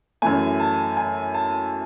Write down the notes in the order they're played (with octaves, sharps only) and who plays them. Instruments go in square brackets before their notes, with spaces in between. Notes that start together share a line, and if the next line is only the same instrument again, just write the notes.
[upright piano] F#2 E3 A3 G#5
A5
G#5
A5